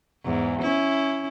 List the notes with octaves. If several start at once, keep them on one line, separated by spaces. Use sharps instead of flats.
E2 G#2
C#4 E4